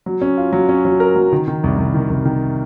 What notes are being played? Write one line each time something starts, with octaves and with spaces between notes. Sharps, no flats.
F#3
C#4
F4
F#3
C#4
F#3
A#4
F#3
D#3
D#3
C2
C2
D#3
C2
D#3